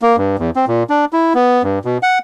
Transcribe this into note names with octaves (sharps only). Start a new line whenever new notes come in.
A#3
G2
E2
C4
A#2
D4
E4
B3
G2
B2
F#5